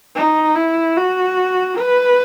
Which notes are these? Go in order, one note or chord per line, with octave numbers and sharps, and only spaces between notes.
D#4
E4
F#4
B4